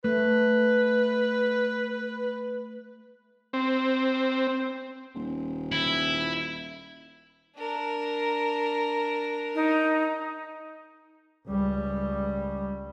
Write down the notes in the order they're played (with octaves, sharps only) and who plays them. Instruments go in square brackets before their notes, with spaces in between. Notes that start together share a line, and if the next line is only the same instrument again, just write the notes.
[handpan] A3 [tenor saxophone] B4
[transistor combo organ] C4
[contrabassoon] D#1
[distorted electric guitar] E4
[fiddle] D4 A#4
[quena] D#4
[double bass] C#2 G3